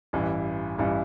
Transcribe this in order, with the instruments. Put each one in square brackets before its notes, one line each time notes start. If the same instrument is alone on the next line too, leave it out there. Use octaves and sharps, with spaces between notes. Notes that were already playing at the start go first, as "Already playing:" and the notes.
[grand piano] A1 G2 E3
A1 G2 E3